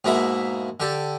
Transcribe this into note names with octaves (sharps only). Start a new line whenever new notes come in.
G#2 B2 A#3 E4 E5 B5
D3 G4 A4